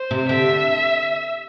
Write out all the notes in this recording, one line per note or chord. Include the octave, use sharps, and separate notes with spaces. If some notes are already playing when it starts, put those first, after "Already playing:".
Already playing: C5
C3
D3 E5